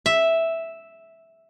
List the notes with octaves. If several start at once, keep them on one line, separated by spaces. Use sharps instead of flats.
E5